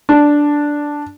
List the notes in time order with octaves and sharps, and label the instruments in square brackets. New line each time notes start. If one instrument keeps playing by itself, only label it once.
[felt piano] D4